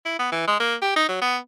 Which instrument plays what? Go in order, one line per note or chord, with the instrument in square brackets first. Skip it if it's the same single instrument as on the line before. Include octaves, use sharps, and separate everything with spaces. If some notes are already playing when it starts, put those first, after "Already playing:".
[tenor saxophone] E4
B3
E3
G#3
A#3
G4
D#4
F#3
B3